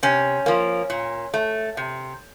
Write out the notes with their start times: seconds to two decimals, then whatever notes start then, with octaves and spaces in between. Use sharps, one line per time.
0.03 C3 C#4
0.46 F3 A#3
0.90 A#2
1.34 A3
1.77 C3